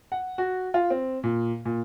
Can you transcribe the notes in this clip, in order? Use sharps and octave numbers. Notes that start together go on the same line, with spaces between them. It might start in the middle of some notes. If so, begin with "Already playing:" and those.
F#5
F#4
F4
C4
A#2
A#2